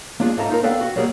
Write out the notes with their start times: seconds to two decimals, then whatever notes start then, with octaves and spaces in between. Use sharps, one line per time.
0.20 A#3 D4 F4 G#4
0.37 G#2 F4 A4 E5 A#5
0.49 D#4 F4 A#4
0.63 B3 D4 A4 F5 G5
0.81 F#4
0.96 F#3 G3 A#3 G#4